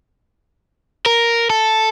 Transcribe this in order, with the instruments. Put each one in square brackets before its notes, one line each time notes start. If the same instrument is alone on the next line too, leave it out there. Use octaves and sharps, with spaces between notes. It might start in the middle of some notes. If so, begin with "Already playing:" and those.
[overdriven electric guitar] A#4
A4